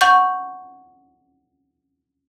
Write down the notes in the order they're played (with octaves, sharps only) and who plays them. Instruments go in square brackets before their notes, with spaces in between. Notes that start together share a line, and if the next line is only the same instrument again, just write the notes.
[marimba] F#5 C#6 G6